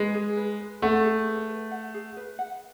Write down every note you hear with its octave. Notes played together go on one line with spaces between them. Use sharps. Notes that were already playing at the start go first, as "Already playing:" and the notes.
Already playing: G#3 B4
G#4
B4
B4
A3 F#5
G#4
B4
B4
F#5
G#4
B4
F#5